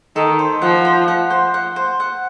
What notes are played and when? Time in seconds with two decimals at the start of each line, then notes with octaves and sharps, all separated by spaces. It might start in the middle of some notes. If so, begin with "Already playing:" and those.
0.16 D#3 A4
0.39 C5
0.62 F3 F#5
0.85 C5
1.08 F#5
1.30 C5
1.54 F#5
1.76 C5
2.00 F#5